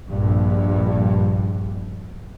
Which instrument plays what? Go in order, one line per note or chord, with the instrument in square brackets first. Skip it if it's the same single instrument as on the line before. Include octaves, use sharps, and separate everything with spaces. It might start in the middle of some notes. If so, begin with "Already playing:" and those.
[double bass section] A#1 G2